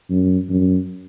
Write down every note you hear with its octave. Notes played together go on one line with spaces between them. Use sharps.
F#2
F#2